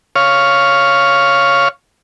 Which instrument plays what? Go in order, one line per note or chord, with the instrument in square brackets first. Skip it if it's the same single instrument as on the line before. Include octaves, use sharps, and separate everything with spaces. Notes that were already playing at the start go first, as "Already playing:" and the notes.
[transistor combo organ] C#5 F5